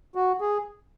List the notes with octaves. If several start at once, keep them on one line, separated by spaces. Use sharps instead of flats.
F#4
G#4